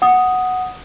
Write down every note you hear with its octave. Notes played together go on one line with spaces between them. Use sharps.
F#5 D#6